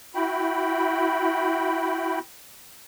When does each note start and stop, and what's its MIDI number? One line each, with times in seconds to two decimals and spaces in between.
0.15 2.19 64
0.15 2.19 66
0.15 2.19 79
0.15 2.19 83